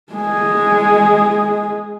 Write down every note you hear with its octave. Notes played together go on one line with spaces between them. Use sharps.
G#3 G#4